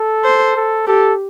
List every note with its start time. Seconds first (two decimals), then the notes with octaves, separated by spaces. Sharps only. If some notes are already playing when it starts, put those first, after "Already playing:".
Already playing: A4
0.25 C5
0.56 A4
0.87 G4 A4